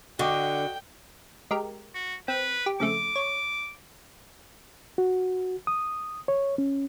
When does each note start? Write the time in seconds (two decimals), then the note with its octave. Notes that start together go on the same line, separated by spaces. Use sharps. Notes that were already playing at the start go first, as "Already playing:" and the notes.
0.19 D3 F#4 D#5 G5 C#6 D6
1.51 G#3 G4 A#4
1.95 F#4
2.28 C4 B4
2.66 G4
2.80 F2 C#3 A3 D6
3.16 C#5
4.98 F#4
5.67 D#6
6.28 C#5
6.58 C#4